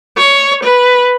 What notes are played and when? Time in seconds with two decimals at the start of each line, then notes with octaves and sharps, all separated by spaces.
0.17 C#5
0.63 B4